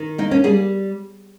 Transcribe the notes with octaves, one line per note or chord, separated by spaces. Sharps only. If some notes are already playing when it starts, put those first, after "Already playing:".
Already playing: D#3
A#3 D#4
C#4
G3 G#4